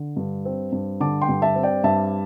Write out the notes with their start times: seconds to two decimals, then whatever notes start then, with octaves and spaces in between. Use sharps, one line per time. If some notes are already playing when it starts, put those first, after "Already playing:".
Already playing: D3
0.16 G2
0.45 C4
0.72 G2
1.00 D3 A5 D6
1.21 G5 C6
1.29 G2
1.42 E5 A5
1.56 C4
1.63 D5 G5
1.84 G2 E5 A5